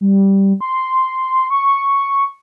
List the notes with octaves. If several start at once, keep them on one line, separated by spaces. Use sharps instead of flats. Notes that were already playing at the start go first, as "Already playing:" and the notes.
G3
C6
C#6